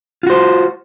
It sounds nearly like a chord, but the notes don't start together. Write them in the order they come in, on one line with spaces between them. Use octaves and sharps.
F4 F#4 C5